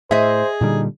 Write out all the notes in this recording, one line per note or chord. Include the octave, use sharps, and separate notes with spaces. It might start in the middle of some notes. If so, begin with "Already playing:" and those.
A2 G#4 C5 D#5 E5
A#2 D3 G3 D#4